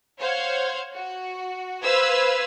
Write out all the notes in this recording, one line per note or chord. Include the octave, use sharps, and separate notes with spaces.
C5 C#5 F5 F#5 G#6
F#4
B4 C5 F5 E6 G#6